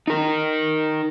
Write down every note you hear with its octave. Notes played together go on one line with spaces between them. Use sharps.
D#4 A#4